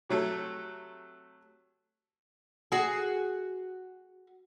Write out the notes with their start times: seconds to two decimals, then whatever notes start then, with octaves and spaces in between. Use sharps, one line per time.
0.09 C3 F#3 A3 A4
2.72 F#4 G#4